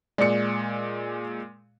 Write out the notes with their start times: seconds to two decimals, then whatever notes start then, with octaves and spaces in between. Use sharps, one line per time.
0.18 A#2 G#3 D5 C#7